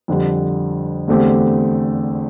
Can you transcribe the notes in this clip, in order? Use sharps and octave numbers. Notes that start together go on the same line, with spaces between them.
F2 D3 G3
E2 D3 A3 C4 G4